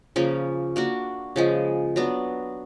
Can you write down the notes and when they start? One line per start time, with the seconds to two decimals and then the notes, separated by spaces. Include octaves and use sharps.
0.16 C#3 F3 A#3 C#4
0.76 A#3 D4 F#4
1.36 C#3 F3 G#3
1.96 F#3 B3 D4